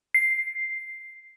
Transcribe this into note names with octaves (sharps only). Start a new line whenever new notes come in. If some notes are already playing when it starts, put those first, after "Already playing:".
C7